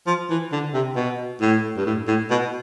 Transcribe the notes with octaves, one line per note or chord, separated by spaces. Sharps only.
F3
E3
D3
C3
B2
A2
G2
A2
A2
B2